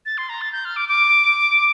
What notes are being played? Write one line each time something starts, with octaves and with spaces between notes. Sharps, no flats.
A6
C6
A#5
A6
G6
F6
D6
D6